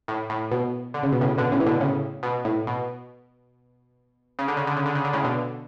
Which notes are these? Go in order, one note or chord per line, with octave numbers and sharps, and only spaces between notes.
A2
A2
B2
D3
C#3
B2
A2 C#3
B2 D3
A2 C#3
E3
B2 D3
A2 C#3
B2
A2
B2
C#3
D3
C#3
D3
C#3
D3
C#3
D3
A2 C#3
B2 D3